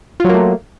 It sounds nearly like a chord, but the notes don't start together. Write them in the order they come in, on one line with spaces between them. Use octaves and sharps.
F4 F#3 A#3 A3